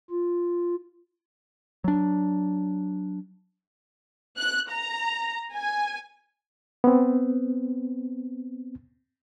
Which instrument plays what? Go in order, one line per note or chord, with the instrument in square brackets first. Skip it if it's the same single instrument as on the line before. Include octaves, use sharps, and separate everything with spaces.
[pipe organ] F4
[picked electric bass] F#3 D4
[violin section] F#6
A#5
G#5
[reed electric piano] B3 C4